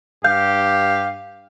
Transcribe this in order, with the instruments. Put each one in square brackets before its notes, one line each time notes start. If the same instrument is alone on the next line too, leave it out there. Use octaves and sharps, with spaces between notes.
[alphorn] G2 [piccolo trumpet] G4 [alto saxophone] F5 [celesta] G6